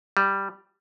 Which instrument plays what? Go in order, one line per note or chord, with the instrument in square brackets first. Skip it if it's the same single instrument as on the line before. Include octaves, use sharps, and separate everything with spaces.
[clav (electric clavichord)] G3